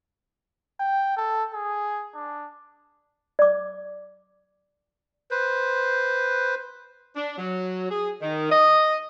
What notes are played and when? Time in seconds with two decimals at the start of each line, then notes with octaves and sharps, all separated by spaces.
0.80 G5
1.17 A4
1.54 G#4
2.15 D4
3.39 D5 D6
5.31 B4 C5
7.16 D4
7.38 F#3
7.90 G#4
8.21 D#3
8.51 D#5